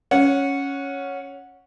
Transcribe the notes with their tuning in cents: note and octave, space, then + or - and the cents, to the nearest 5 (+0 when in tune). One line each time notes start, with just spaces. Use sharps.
C#4 +0 F#5 -15